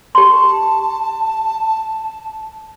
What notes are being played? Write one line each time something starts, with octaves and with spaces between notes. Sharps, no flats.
G4 A5 C6